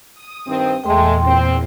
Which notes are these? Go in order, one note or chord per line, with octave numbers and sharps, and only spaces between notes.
D#6
G2 D#3 C4
E2 A#2 G#3 A3 G5 C6
C4